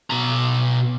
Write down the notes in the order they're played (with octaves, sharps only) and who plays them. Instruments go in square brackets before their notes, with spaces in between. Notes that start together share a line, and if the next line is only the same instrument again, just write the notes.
[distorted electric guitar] B2 A#5